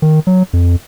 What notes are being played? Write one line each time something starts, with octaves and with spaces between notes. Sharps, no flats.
D#3
F#3
F2